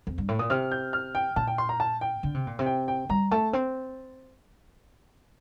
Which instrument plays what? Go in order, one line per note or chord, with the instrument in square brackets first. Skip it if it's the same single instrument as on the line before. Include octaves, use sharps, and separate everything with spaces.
[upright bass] F2
G2
A2
[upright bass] A#2 [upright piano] D#6
[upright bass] C3 [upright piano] F6
[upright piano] G6
F6
G5
[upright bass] A#2 [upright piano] A5
[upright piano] G5
C6
A#5
A5
G5
[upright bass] D3
C3
A#2
C3
[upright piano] G5
G5
[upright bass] G3 [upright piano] A#5
[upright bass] A3 [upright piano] A5
[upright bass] C4